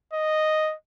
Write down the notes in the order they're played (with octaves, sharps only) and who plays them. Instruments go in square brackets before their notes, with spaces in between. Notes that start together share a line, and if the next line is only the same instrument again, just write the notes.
[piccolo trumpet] D#5